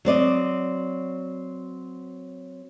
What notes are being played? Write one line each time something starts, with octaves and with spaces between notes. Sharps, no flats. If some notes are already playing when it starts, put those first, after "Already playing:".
F#3 C4 D5 D#5